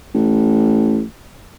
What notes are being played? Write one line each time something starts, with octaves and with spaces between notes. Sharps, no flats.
A1